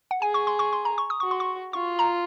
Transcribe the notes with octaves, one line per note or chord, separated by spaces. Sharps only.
F#5
G#4 G#5
C#6
C6
C#6
C6
A#5
C#6
D#6
F#4 C#6
C6
C#6
F4 C#6
A#5